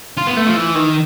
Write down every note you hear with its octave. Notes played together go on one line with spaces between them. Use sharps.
F4
B3
A3
F3
E3
D#3